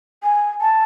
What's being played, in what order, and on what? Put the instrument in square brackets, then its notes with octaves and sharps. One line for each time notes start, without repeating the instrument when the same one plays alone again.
[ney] G#5
A5